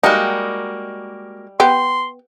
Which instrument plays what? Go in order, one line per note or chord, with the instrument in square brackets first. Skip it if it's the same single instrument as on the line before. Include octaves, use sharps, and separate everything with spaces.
[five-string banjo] G3 D#4 [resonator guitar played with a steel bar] G#3 A#3 F#4 [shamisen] G4
[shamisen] B3 G4 [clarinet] C6